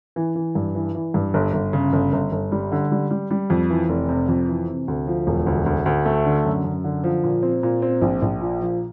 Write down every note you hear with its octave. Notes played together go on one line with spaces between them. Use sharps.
E3
E3
G2
E3
E3
G2
G1
G1
C#3
G1
G1
G1
G3
D3
G3
G3
G3
F2
E3
F1
C3
F2
E3
C3
D2
F3
E1
D2
D2
D2
A3
D3
F#2
F#2
D3
F3
A#2
C4
A#2
C4
A#1
A#1
A#2
F3